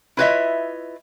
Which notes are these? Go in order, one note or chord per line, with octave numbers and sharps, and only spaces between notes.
E4 F4 B4 C#5 D#5 E5